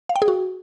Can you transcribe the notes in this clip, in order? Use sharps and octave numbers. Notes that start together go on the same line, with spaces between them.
F5
G5
G#4
F#4